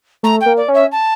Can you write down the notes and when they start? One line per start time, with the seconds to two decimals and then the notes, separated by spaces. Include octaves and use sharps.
0.23 A3 A#5
0.41 G5
0.46 A#3
0.57 D5
0.68 C#4
0.74 E5
0.91 A5